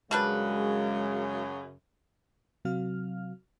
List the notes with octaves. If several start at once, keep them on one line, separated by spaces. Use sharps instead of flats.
F#2 C#3 G3 G#3 D4 B4
C3 F#3 C4 F#4 F5 F6